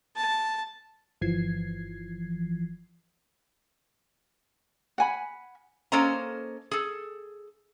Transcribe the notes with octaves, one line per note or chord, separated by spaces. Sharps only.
A5
G1 E3 F3 G#6 C7
F#5 G#5 B5
A#3 C#4 A4 C5 D#5 A#5
G#4 A4